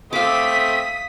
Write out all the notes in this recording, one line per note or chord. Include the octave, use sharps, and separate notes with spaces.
A3 C4 E5 F5 D6 D#6 B6